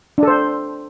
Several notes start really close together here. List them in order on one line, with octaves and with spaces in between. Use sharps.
D4 A4 C5